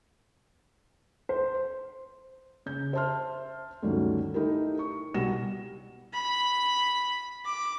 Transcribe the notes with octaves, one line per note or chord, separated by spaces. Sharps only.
C5
C#3 G6
C5 E5 A5 C6 F6
D2 G2 D#3 F#3 A3 C#4
D#4 E4 G4 A4 A#4
C#6
C2 B2 G3 F#5 A#6 E7
B5
D6